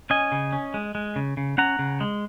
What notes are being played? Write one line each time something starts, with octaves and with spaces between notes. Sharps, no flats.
C#4 D#5 G#5
C#3
C#4
G#3
G#3
C#3
C#3
C#4 F#5 A#5
C#3
G#3